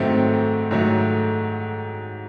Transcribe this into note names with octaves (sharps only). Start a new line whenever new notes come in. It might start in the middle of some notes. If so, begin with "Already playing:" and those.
Already playing: G#2 D#3 F#3 A3 C4
G#2 D#3 F#3 A3